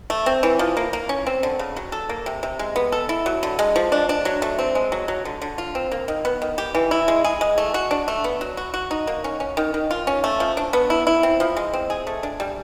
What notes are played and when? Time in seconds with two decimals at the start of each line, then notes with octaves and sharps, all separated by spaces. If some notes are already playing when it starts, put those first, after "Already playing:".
0.10 A3
0.26 C4
0.43 E3
0.59 F3
0.77 A#3
0.93 A#3
1.09 C#4
1.27 C4
1.43 D3
1.59 C#3
1.77 F#3
1.92 A4
2.09 A#3
2.26 C3
2.43 C3
2.59 G#3
2.76 B3
2.92 A4
3.09 E4
3.26 F#3
3.43 D3
3.59 G#3
3.76 F3
3.92 D4
4.09 D4
4.25 F#3
4.42 A3
4.59 C4
4.75 G#3
4.92 F#3
5.08 F#3
5.25 D3
5.42 D3
5.58 F4
5.75 C4
5.92 A#3
6.08 D#3
6.25 B3
6.42 D#3
6.58 G4
6.75 E3
6.91 E4
7.08 G#3
7.24 G#4
7.41 G#3
7.58 A3
7.74 F#4
7.91 D4
8.08 A3
8.24 B3
8.41 F#3
8.57 F#4
8.74 F#4
8.91 D#4
9.07 A#3
9.24 C#4
9.40 C#4
9.57 D#3
9.74 D#3
9.91 F4
10.07 C#4
10.24 A3
10.40 F3
10.57 D4
10.73 B3
10.90 E4
11.07 E4
11.23 C4
11.40 F3
11.57 G#3
11.73 C4
11.90 G#4
12.07 A3
12.23 D4
12.40 G3